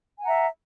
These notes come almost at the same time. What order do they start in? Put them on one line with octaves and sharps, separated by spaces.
G#5 F#5 A#5 E5